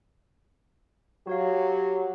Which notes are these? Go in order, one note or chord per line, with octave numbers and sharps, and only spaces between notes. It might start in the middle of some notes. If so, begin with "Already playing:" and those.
F#3 F#4 G4 C#5 F5